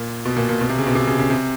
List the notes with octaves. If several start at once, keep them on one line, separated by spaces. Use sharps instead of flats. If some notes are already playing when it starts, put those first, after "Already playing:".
Already playing: A#2
B2
A#2
A#2
B2
C3
C#3
B2
C3
C#3
C#3
C3